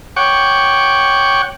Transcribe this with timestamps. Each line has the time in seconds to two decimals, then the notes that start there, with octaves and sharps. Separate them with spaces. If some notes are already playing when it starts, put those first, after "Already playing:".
0.16 C#5 F#5 G5 C#6 D6